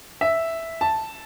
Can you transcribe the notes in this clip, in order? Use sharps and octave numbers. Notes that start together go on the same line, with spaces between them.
E5
A5